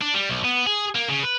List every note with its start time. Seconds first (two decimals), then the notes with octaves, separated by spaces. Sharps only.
0.01 D4
0.14 G3
0.30 B1
0.45 B3
0.67 G#4
0.95 A#3
1.09 C#3
1.23 B4